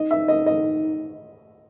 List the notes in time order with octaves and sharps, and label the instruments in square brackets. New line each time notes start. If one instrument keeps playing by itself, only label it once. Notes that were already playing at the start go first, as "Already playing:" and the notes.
Already playing: [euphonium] D#4 [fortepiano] D#5
[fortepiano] E5
D#5
D#5